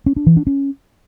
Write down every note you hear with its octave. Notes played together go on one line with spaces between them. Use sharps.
C#4
D4
E3
D4
C#4